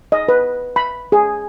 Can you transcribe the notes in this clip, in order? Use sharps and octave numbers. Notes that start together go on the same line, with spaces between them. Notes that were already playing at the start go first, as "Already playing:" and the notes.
D#5
B4
B5
G#4